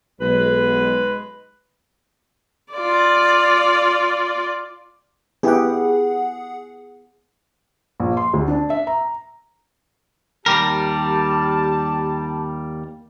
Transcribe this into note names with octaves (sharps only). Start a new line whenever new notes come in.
B1 G#3 B4
F4 D5
B3 E4 G4 G#4 F#5
A#1
C6
D2
D4
E5
A#5
D#2 G3 G4 A#4 A5